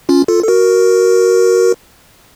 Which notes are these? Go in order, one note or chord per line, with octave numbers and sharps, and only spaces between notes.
C#4 F4
F4 A4
A4
F#4 A#4